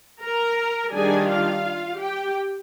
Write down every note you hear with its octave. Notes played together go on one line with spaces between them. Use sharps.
A#4 A#5
D#3 G3 D4 G#4 G#5
F4 F5
G4 G5